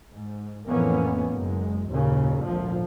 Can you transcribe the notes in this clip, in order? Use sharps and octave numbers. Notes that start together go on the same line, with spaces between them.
G#2
F2 A2 E3 A#3 B3 C#4
F#1 F#2 G#3
F#1 D#2 A#2 C#3
G#1 D2 A#2 F3